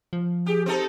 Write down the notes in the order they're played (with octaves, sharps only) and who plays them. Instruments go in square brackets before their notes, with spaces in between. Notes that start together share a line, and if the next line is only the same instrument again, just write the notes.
[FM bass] F3
[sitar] G4 [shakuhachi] G#4
[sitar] C4 D#4 A4 [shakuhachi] C5